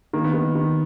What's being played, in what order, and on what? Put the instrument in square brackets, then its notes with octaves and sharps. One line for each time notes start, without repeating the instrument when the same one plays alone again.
[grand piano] D#3 [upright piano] A#3
[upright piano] B3
[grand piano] D#3 [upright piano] A#3
[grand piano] D#3